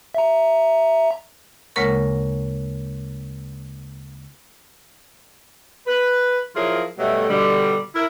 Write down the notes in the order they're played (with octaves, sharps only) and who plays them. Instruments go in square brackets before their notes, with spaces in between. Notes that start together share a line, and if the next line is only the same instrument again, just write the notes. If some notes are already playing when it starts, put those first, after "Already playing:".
[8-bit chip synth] E5 A#5
[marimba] D2 C#3 G#3 A#3 A#4 C#6
[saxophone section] B4
F3 F#3 E4 F4 G#4 A#4
B2 F#3 G3 A3
B2 D3 G3
E4 A#4